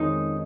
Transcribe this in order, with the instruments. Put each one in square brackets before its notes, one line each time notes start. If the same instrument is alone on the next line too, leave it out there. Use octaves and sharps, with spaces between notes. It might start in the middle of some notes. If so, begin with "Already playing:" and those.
Already playing: [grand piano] F2 D#3 G#3 C#4 [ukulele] D#4